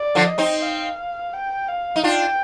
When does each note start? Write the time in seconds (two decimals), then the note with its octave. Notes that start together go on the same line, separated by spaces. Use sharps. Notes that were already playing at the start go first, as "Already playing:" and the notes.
Already playing: D5
0.15 D3 F3
0.26 D#5
0.38 C4 D#4
0.62 F5
1.33 G5
1.68 F5
1.96 D#4
2.03 D4 F4 G5